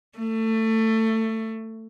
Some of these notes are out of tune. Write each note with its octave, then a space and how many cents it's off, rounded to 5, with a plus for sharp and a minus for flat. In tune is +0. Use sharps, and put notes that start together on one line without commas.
A3 +20